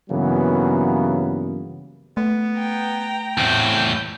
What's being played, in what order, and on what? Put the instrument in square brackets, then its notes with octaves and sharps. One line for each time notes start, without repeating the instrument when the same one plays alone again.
[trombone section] G2 C#3 E3 F#3 A#3 B3
[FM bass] A3 [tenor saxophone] B3
[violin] G5 A#5
[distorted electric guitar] E2 A2 [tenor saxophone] C4 [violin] G6